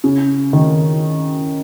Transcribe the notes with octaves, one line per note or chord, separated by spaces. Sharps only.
C#3
D#3